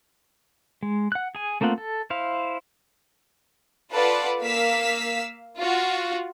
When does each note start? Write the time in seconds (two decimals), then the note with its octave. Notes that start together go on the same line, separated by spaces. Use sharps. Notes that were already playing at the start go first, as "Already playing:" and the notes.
0.83 G#3
1.12 F#5 F#6
1.35 G#4 G#5
1.61 A3 A#3 C4 F4 F#5
1.78 A4
2.10 E4 C5 F5
3.92 F4 A4 B4 D5 F#5
4.41 A#3 F5 E6 B6
5.56 F4 F#4